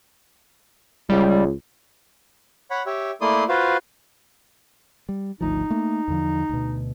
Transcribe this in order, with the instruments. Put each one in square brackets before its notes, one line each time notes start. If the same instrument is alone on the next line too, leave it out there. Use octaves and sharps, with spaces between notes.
[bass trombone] C#2 [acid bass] G3
[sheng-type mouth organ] C#5 F#5 B5
G4 C#5 E5
A3 A#3 E4 D5 C6 D#6
F4 F#4 B4 C5 F5
[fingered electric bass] G3
[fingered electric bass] G#1 D2 F3 [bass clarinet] D#4
[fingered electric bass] A3 A#3
E2 D3 F3
D2 B2